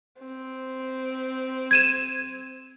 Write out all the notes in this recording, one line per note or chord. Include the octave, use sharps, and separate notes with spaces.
C4
G#6 D#7 E7